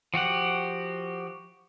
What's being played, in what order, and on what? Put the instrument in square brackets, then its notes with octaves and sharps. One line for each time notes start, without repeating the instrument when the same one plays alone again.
[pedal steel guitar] F3 F#4 G4 F#5